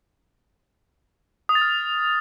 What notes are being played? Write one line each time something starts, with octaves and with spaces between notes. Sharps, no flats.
D#6
A6
F6